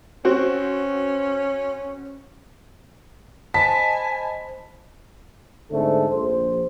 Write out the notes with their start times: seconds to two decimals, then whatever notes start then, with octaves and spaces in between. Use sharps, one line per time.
0.25 C4 C#4 F#4
3.54 C5 D#5 G#5 A5 B5 B6
5.71 G#2 D3 A3 C4 A4
6.12 A#1 C5